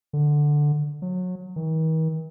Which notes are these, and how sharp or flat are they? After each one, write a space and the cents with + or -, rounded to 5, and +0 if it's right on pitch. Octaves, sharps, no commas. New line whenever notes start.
D3 +5
F#3 -25
D#3 +45